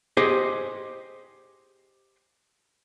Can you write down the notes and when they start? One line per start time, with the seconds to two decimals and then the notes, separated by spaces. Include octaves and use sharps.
0.17 G4 G#4 C5 D#5